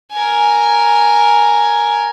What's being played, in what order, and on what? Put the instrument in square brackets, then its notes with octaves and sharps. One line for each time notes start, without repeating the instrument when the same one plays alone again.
[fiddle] A#4 G#5